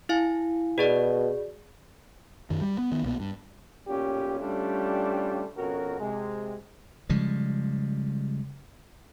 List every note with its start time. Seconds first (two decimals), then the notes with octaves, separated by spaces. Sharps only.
0.09 E4 F5 G#5
0.78 B2 F#4 G#4 D5
2.50 F#2 D#3
2.61 G3
2.78 B3
2.92 D#3 B3
3.03 B1 A#2 C#3 B3
3.20 G2
3.88 B1 A#2 C#4 G4
4.39 G3 A3 C#4 D4 F4 G4
5.57 F2 B2 C#4 F#4 A#4
6.00 C3 G#3
7.09 C#3 F3 G3 G#3